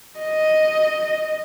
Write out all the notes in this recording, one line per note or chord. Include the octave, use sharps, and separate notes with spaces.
D#5